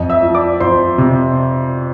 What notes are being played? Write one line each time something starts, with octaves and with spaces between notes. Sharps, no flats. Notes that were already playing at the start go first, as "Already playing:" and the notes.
Already playing: F2 D#5
E5 E6
F3
D5 D6
F2 C5 C6
C3